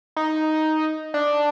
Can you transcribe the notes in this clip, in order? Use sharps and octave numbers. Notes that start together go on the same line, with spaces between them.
D#4
D4